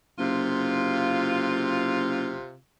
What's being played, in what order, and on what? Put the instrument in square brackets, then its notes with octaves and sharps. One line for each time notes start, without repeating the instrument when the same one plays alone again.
[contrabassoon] F#1 [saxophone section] C3 F4